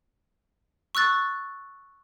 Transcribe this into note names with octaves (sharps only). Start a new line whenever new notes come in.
C#6 E6 F#6 A6